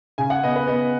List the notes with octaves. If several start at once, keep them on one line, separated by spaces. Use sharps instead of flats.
C#3 G#5
F#5
B3 D#5
B4
B3 D#5